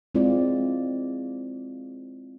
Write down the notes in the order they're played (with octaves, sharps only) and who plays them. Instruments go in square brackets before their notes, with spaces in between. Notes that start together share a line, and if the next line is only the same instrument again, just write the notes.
[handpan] G#3 C4 E4 F4 D5